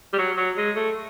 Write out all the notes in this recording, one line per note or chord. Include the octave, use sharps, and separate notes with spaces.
G3
F#3
F#3
G#3
A3